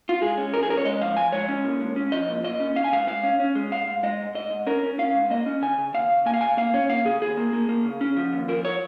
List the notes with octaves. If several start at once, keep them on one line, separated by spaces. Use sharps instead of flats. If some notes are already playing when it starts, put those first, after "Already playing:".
F4
G#3 G#4
C#4
F3 A#4
G#4
C#4 A#4
C#5
G#3 D#5
F3 F5
F3 G#5
G#3 C#5
C#4
A#2
G#3
C#4
F3 D#5
A#2
A#2 D#5
C#4
C#4 F5
G#5
G#2 F5
G#3 F5
C#4
C#4
G#3
G#2 F5
G#2
G#3 D#5
G#2
G#2 D#5
G#2
C#4 A#4
C#4
C#4 F5
G#2
A#3 D#5
C#4
C#3 G#5
C#3
D#2 F5
C#3
A#3 G#5
F5
C#3 G#5
A#3 F5
C#4 C#5
A#3 F5
C#3 G#4
D#2 G#4
A#3
A#3
A#3
C#3
C#4
F3
D#2
F3 A#4
C#5